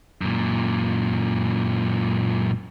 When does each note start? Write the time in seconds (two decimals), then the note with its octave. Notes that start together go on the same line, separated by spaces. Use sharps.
0.21 F#2 A#2